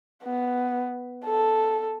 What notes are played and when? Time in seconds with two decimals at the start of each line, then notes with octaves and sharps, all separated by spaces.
0.24 B3
1.25 A4